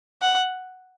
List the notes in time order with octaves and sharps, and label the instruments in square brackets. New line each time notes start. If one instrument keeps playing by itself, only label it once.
[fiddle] F#5